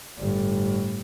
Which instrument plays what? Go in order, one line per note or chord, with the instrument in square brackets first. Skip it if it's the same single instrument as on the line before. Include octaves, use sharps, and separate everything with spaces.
[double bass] G1 A2